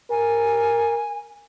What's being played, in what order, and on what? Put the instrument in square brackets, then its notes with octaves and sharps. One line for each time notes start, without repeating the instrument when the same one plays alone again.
[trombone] A#4 [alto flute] G#5